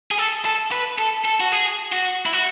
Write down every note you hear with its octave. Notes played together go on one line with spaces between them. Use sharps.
G#4
A4
A4
B4
A4
A4
F#4
G#4
F#4
E4
F#4